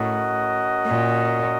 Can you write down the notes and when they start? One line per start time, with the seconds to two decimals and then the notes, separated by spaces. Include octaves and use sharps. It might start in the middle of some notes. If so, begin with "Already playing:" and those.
Already playing: A2 C#4 F#4 A#4 D#5 F#5
0.86 A#2